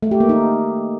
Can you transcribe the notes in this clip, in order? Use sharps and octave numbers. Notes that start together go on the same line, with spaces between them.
A3
G4
A#3
D#4